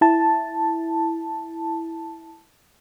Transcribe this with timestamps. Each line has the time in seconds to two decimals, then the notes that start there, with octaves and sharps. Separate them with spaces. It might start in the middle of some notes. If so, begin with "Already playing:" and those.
0.01 E4 A5